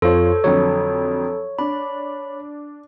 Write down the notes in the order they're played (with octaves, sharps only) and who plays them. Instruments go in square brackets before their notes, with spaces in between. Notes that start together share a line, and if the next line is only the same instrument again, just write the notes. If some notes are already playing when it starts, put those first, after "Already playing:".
[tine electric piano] F2 F4 [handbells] A4 [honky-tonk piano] C5 C#5
[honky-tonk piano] F2 D3 F#3 [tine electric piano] C#5
[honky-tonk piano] D4 [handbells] B5